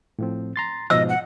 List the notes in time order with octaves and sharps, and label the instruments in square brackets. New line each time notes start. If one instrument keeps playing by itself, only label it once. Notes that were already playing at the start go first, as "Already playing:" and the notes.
[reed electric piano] A2 F3 C4
A#5 C6 A6
[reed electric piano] G#2 B2 F3 [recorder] D#5 [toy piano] E6
[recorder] F#5